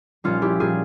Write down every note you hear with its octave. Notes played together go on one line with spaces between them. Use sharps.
A#1 A#2 G3 C#4 F4
E4 G4
A#2 G3 F4 G#4